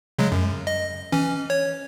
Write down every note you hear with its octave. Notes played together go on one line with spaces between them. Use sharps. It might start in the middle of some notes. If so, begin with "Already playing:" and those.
C#3 F#3 G#3
F#2
D#5
E3 C#4
C#5